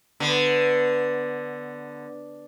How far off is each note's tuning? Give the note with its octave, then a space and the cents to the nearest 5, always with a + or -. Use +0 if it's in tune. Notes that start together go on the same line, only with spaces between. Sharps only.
D3 +0 B3 +0